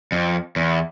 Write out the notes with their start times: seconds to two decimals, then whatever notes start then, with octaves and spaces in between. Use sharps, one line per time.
0.12 F2
0.56 E2